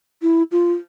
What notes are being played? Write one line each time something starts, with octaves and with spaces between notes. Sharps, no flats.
E4
F4